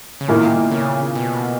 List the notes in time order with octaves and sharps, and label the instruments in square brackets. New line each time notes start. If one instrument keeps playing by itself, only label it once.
[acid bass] C#3
[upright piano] A#2 A#3 E4 [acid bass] D#3
[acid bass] C#3
B2